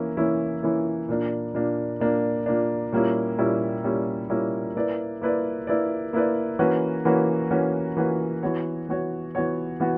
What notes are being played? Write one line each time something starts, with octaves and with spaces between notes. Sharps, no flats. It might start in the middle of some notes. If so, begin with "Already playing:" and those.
Already playing: E3 A#3 C#4 E4
E3 A#3 C#4 E4
E3 A#3 C#4 E4
A#2 A#3 D4
A#2 A#3 D4
A#2 A#3 D4
A#2 A#3 D4
A#2 G3 A#3 C#4 E4
A#2 G3 A#3 C#4 E4
A#2 G3 A#3 C#4 E4
A#2 G3 A#3 C#4 E4
A#3 E4 B4 D5
A#3 E4 B4 D5
A#3 E4 B4 D5
A#3 E4 B4 D5
E3 A#3 C#4 F#4 B4
E3 A#3 C#4 F#4 B4
E3 A#3 C#4 F#4 B4
E3 A#3 C#4 F#4 B4
E3 B3 F#4 C#5
E3 B3 F#4 C#5
E3 B3 F#4 C#5
E3 B3 F#4